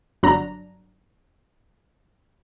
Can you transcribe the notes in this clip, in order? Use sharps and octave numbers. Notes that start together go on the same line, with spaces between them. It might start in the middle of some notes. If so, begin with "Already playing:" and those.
G1 F#3 D4 A#5